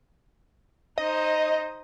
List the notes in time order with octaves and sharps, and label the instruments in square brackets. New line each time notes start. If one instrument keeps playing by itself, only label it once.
[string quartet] D#4 C5 [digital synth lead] D#5